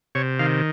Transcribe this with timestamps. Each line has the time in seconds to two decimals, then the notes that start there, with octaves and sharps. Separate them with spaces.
0.15 C3 C#5
0.39 D#3 F5